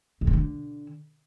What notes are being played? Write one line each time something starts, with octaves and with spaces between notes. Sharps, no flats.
A#2
B2
D3